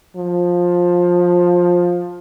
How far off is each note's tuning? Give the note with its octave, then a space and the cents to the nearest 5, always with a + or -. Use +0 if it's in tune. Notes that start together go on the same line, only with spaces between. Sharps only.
F3 +15